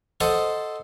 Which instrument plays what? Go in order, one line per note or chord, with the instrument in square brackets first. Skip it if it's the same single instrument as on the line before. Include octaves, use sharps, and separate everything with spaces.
[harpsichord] A4 C5 D#5 F#5